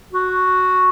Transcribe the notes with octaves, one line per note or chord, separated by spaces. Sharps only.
F#4